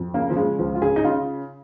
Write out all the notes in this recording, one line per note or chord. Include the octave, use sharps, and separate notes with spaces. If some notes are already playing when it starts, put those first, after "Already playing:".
Already playing: F2
C#3 A#3
F3
C#3 G#3
C#2 F3
F4
C#3 G#4
D#4
C#3 F4